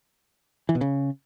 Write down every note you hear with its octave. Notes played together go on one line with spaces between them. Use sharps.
E3
B2
C#3